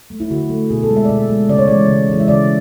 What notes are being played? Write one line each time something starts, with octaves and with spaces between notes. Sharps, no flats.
A3
E4
D3 F#4
A3
B2 G#4
A4
G#3
E5
D5
B2 E5
G#3
C#3 D5
C#5
E3 G#3 D5
C#3
E3 G#3
E5
C#3 D5